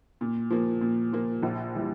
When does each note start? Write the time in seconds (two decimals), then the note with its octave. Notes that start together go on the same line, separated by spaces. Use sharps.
0.21 A#2
0.51 F3 A#3
0.81 A#2
1.13 F3 A#3
1.43 A#1
1.75 E3 G3